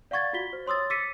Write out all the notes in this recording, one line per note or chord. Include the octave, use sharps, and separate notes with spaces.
D5 F5 F#5 C#6 G#6 A6
F4 F#4 B6 G7
C5
C#5 C6 D#6 E6 A6
D6 E6 A6 B6 C#7 D#7